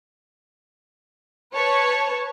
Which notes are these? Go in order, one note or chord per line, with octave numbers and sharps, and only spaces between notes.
B4 C#5 A5